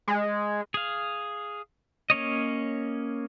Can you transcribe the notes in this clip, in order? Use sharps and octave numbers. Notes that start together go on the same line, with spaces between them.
G#3
G#4 F5
A#3 C#4 C#5 D#5